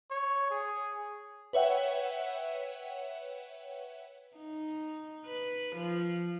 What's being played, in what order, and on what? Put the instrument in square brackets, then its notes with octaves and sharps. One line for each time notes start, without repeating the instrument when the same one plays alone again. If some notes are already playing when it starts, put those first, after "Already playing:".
[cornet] C#5
G#4
[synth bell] B4 C#5 E5 F#5 G5
[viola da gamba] D#4
B4
F3